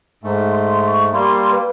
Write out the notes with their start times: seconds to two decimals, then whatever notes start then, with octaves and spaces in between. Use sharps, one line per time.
0.24 G#2 A3
0.52 C6
0.87 C#6
1.13 G3 A#3 C6
1.51 B4